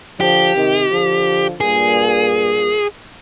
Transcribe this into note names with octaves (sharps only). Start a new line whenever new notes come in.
D3 F3 G4
C3 D#3
D3 F3
G2 A#2 G#4